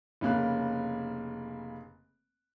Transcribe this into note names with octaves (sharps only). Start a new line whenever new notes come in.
F1 C#3 A#3 F#6